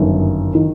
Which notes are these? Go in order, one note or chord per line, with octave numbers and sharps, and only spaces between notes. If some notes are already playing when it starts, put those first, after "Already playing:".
Already playing: G1 F#2 D#3
D#3